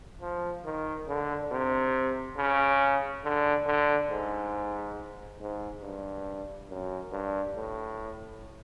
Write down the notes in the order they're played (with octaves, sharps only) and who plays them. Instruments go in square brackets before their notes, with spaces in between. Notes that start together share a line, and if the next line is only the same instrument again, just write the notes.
[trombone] F3
D#3
D3
C3
C#3
D3
D3
G#2
G#2
G2
F#2
G2
A2